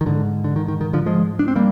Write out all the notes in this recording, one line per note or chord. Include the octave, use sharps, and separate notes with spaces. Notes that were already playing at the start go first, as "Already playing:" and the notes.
D#3
G#2 D3
D3
D#3
D#3
D#3
D3 F3
F3 G#3
D4
C4
G3 A#3